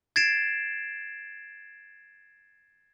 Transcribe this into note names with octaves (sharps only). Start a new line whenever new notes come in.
G#6 A6 C7 D7 E7